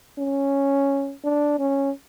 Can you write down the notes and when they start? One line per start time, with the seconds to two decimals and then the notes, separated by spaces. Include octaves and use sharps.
0.19 C#4
1.24 D4
1.59 C#4